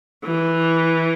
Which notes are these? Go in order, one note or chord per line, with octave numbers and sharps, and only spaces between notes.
E3